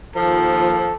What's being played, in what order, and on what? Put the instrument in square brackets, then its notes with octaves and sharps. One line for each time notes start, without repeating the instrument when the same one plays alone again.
[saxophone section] D#2 F3 [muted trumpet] A4